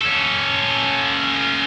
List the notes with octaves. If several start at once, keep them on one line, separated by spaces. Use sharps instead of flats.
C#4 A4